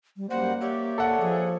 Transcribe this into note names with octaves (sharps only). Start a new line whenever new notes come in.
G3
F#2 G3 A#3 C5 F#5
G4 C#5 D5 E5
A4 F#5
F3 G#4